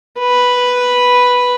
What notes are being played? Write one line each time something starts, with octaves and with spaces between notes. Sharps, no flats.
B4